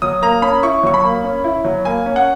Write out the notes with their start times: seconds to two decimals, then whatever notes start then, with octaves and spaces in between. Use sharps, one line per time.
0.02 F#3 D#6
0.22 A#3 A#5
0.42 C#4 B5
0.63 E4 C#6
0.83 F#3 C#6
0.94 B5
1.04 A#3
1.24 C#4
1.44 E4
1.65 F#3
1.85 A#3 G#5
2.06 C#4
2.16 F#5